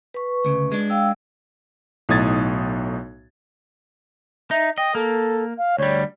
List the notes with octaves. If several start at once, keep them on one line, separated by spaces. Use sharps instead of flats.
B4 C#6
D2 C#3
G#3 D4
F5 G5 E6
B1 A2 D#4 D#6 G#6 A6
D#4 E5
D#5 G5
A#3 A4
F5
D2 G3 C#5